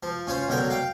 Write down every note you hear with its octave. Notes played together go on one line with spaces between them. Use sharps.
F3
C#4 F4 C5
B1 D3 F#3 A#4 G5
F5 G5